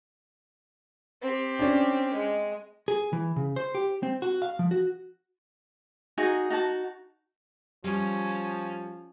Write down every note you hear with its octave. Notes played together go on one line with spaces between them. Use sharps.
C4 G4
C#4 D4
G#3
G#4
E3
C#3
C5
G4
C4
F#4
F5
F3
F#4
D#4 F#4 G#4 G#5
D#4 F#4 A5
F3 G3 C#4